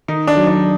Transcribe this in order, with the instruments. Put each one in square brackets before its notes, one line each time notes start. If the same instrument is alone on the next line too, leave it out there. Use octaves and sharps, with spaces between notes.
[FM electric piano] D#3 [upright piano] D#4
[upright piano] D4
[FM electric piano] F#3
[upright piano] D4